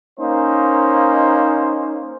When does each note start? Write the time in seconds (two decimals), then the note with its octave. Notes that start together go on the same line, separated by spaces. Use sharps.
0.19 A#3 C#4 D#4 C5